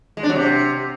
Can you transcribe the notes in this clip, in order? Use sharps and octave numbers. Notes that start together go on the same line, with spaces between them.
G#3
D4
F#3
C3